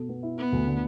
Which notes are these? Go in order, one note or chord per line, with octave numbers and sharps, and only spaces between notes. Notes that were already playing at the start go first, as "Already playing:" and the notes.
Already playing: B2 A4
B3
E4
B3 E4
D2
D3